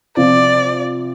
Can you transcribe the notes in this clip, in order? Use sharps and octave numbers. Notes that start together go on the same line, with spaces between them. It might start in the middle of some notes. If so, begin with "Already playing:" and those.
C3 F3 C4 F4 D5